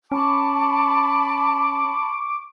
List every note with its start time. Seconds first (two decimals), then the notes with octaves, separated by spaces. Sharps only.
0.12 C#4 A5 B5 C#6 D6